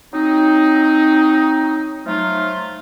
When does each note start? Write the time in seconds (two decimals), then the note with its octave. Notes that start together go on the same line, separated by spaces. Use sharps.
0.13 F#3 C4 D#4
2.06 F3 F#3 A3 D#4 F4